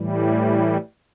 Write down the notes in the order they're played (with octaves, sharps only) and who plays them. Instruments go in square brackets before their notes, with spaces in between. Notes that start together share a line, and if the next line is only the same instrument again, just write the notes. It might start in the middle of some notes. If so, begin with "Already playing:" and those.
Already playing: [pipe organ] A2 E3 G3